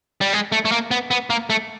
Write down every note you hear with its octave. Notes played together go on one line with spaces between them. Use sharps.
G3
G#3
A3
A3
A#3
B3
B3
A#3
A3